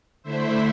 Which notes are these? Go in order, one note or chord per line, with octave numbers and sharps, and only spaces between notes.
D3 A3 E4 C5 E5